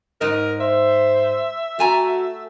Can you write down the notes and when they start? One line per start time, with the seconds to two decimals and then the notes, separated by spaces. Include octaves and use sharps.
0.21 G#2 A#4 D#5
0.61 C5 E5
1.79 A3 F#4 G#5 A#5